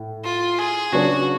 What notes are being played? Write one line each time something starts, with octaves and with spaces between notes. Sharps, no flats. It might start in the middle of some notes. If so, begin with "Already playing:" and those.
Already playing: A2
F4
G#4
C#3 F#3 B3 D4 F#4